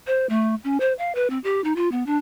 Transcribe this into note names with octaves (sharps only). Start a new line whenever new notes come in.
C5
A3
C#4
C5
F5
B4
C4
G4
D#4
F4
B3
D4